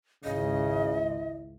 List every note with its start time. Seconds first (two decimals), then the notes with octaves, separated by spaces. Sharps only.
0.24 G#1 C#2 C#3 E4 D#5